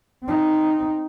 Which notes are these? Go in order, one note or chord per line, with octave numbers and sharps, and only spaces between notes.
C4 D#4